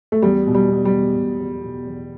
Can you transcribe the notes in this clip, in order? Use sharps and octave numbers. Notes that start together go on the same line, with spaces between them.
A3
E2 G3
B2
G3
B2
G3
E2
B2
E2
B2
E2